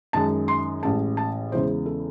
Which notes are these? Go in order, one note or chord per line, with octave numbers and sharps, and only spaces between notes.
F#2 D#3 G#3 A5
C6
A1 A2 G#3 A5
A5
E2 C#3 E3 G#3 C5
A4